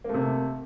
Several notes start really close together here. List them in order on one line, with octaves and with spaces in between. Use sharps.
A#3 A3 C3